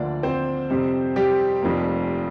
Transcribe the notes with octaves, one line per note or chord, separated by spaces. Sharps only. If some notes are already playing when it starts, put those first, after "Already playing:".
Already playing: D2 D3 F3 A#3 D4 D5
C4 C5
F2 C3 G3
G3 G4
F1 F2 F3 A#3